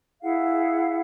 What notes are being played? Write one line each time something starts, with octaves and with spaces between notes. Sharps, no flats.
E4 G#4 F5 F#5